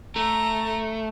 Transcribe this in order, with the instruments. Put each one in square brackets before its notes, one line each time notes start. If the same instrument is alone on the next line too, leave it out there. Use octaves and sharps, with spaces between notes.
[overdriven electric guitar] A3 [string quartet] A#5